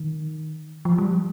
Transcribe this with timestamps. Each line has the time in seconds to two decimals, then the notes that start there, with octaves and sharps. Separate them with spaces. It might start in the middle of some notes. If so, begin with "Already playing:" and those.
Already playing: D#3
0.85 F3
0.98 G3